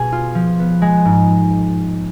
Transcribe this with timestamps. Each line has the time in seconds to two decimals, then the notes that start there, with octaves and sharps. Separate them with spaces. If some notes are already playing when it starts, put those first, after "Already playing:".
Already playing: B2 G#4
0.12 F4
0.35 F3
0.59 B3
0.82 G#3
1.05 G#2